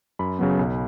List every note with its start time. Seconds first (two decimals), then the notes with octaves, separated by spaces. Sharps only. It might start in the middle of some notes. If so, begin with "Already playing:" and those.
0.19 F#2 B5
0.39 C#3 F#3 B3
0.59 B1